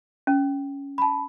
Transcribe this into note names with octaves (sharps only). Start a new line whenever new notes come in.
C#4
A5 B5